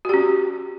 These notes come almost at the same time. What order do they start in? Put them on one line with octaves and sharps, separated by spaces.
F#4 G4 C#4